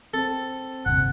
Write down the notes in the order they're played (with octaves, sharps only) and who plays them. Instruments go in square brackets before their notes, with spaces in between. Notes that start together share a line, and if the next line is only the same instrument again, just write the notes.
[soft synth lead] C4 [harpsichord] A4
[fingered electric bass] G1 D#2 C3 [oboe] F#5